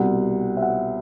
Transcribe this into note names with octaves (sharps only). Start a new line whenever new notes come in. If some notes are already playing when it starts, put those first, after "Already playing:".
Already playing: C2 B2 F#5
E5
F#5